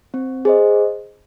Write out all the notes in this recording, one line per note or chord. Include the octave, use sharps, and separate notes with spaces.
C4
G#4 C5 D#5